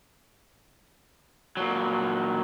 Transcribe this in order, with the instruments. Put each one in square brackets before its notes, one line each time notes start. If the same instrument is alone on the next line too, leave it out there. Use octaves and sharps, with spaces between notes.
[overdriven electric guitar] A#2 F#3